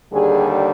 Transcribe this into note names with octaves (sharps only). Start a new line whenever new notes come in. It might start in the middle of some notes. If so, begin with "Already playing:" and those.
D#2 D3 G3 G#4